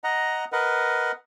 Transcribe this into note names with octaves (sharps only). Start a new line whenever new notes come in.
D#5 F#5 A#5
A#4 B4 D#5 F#5